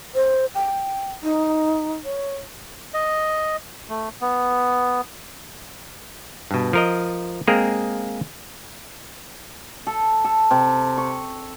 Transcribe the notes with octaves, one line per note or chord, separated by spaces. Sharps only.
C5
G5
D#4
C#5
D#5
A3
B3
G2 B2
F3 A#4 D#5
G#3 A#3 C4 G#4 A#4
A4
A4
C3
C#6